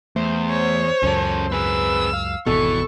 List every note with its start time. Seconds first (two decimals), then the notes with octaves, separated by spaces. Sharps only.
0.16 E2 A3 C5
0.49 C#5
1.03 C#2 F#2 C#4 A4
1.52 C4 G#4 B4 E6
2.13 F5
2.46 G#1 E2 B2 E3 A4 C#6